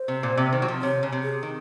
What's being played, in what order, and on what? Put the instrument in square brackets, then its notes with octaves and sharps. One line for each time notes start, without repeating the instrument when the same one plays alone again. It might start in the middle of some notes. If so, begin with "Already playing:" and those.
Already playing: [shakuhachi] C5
[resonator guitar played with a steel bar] C3
A#2
C3
D#3
F#3
F3
[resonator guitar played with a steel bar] C3 [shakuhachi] C#5
[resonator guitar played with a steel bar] C#3
C3
[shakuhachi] G#4
[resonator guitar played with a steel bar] D#3